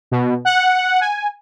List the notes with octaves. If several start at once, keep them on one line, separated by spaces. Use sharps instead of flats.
B2
F#5
G#5